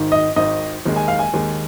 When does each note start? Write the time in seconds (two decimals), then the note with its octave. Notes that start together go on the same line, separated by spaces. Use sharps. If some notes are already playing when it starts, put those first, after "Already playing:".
Already playing: G#1 G#2 D#3
0.12 D#5
0.36 G#1 G#2 D#3 D#5
0.86 D#2 D#3 G#3
0.96 G#5
1.08 F5
1.19 G#5
1.34 D#2 D#3 G#3